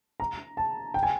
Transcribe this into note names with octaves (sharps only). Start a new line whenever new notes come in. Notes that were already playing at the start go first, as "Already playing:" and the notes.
A#5
A5
G5
G#5